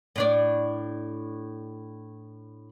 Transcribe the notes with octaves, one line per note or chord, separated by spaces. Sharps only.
A2 D4 D5